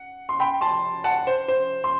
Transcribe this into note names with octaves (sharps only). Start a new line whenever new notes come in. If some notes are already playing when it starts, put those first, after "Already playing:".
Already playing: F#5
C6
G5 B5
A5 C6
F#5 A5
C5
C5
C6